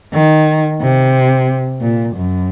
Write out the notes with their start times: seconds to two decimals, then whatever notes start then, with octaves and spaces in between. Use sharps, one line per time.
0.14 D#3
0.81 C3
1.81 A#2
2.16 F#2